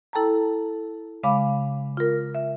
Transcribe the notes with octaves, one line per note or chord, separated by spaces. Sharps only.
E4 A4 G5 A5 A#5
C#3 G#3 F5 B5 D6
F4 A#4
E5